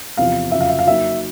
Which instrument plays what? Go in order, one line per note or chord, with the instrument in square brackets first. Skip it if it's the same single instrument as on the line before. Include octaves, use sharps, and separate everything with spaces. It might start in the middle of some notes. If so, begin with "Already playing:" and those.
[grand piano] E2 C3 F3 [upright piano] F5
[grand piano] F2 C#3 F#3 [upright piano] E5
[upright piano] F5
E5
F5
[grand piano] F#3 A#3 D#4 [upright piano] E5